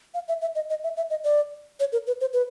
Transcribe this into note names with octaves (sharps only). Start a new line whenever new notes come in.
F5
E5
E5
D#5
D#5
E5
E5
D#5
D5
C#5
A#4
B4
C5
B4